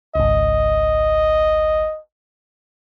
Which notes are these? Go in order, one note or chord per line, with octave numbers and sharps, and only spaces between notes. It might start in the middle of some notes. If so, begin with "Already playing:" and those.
G#1 C#2 D#5